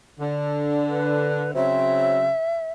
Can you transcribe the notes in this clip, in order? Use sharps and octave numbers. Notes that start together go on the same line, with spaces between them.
D3
B4
C#3 F#3 C4 E5